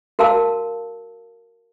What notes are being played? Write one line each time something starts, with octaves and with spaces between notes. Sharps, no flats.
F#4 A#4 F5 A5 E6